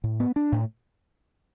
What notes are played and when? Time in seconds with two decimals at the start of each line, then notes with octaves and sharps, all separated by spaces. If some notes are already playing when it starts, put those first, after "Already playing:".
0.04 A2
0.20 B3
0.36 D4
0.52 A2